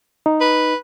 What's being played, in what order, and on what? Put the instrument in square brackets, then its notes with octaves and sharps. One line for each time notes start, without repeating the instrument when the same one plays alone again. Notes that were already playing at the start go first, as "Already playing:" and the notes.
[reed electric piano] D#4
[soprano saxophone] B4